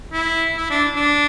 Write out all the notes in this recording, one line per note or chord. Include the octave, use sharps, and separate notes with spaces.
E4
E4
D4
D4